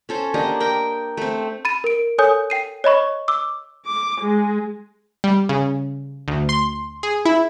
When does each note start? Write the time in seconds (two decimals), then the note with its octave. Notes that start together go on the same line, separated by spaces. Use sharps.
0.09 C#4 A4 C5
0.34 A#3 D4 G4 D#5
0.60 A#4 G5
1.17 A3 C4
1.65 B5 A6 D#7
1.84 A#4 D7
2.18 A4 C#5 G#5 D#6 G6
2.50 G5 C7 D#7
2.84 C#5 D#5 B5 C#6
3.28 D6 E6
3.86 D6
4.21 G#3
5.24 G3
5.49 C#3
6.28 D2
6.49 C6
7.03 G#4
7.25 E4